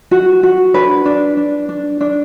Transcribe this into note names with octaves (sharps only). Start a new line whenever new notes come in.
F#4
F#4
D4 B4
D4
D4
D4
D4